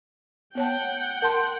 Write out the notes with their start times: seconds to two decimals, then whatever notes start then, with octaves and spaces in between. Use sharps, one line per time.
0.55 B3 C#5 F#5 G5 A5
1.22 A#4 A5 C6